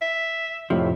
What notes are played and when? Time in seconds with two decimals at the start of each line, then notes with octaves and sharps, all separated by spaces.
0.02 E5
0.70 F2 A2 C3 F3